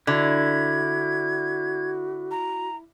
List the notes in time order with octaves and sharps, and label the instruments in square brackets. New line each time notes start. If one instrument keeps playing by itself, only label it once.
[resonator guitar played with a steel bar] D3 [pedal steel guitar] E4 [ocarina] F#4 [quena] G#6
[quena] A#5